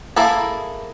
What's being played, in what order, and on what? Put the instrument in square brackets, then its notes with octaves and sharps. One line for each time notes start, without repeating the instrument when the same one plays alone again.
[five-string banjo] A#3 E4 G#4 A4